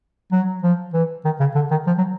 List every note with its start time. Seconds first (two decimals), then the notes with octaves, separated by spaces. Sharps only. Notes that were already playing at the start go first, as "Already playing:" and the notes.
0.32 F#3
0.63 F3
0.93 E3
1.25 D#3
1.40 C#3
1.55 D3
1.71 D#3
1.87 F3
1.98 F#3